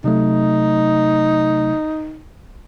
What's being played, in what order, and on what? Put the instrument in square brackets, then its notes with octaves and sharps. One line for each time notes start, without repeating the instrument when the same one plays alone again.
[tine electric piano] C3 F#3 A3 [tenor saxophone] D#4